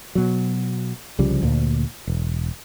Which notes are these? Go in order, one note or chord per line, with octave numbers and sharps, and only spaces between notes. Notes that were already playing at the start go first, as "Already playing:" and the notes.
B2 F#3
C2 C#3 F3 G3
D2 A#2
E1